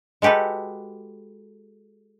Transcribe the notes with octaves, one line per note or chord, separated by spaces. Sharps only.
G#3 F#4 G4 A4 B4